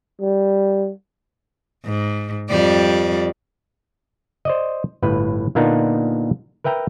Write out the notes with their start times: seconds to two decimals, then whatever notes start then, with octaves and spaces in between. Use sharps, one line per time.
0.21 G3
1.85 G#2
2.50 F2 G3 D5
4.45 C5 D5 D#5
5.02 G1 A2 B4
5.55 A#2 D3 A#3 B3 D4 D#4
6.64 A#4 B4 E5 G5 A#5